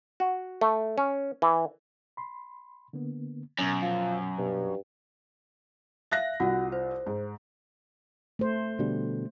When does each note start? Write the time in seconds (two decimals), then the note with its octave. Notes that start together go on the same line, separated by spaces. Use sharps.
0.20 F#4
0.61 A3
0.98 C#4
1.42 E3
2.17 B5 C6
2.93 D3 A#3 B3
3.59 F#2 B2 C#4 C#5
3.82 F3
4.38 G2 B2
6.12 E5 F5 F#6 A#6
6.40 C2 F4 F#4 F#5
6.72 C5
7.06 G#2
8.39 A3 C5
8.79 B2 D3 G3